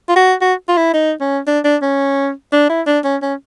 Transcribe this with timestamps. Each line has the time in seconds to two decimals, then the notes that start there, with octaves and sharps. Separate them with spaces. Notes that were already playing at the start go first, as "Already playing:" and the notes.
0.09 F4
0.16 F#4
0.41 F#4
0.68 F4
0.77 E4
0.94 D#4
1.21 C#4
1.47 D4
1.64 D4
1.82 C#4
2.53 D4
2.69 E4
2.87 D4
3.04 C#4
3.22 C#4